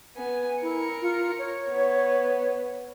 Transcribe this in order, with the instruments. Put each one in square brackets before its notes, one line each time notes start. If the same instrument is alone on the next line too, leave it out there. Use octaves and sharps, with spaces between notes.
[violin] B3 G#5
[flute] E4 [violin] A#4 C#7
[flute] F4
C#5
[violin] B3